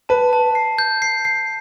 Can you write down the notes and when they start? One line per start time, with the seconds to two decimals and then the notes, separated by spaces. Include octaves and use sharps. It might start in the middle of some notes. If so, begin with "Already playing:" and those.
0.09 B4 A5
0.33 A5
0.55 C7
0.78 G6
1.02 C7
1.25 C7